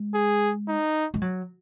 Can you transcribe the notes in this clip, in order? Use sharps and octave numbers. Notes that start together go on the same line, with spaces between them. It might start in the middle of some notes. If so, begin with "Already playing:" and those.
Already playing: G#3
G#4
D#4
G#3
F#3